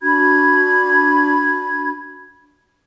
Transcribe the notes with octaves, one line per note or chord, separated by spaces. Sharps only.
D4 F#4 B5 G#6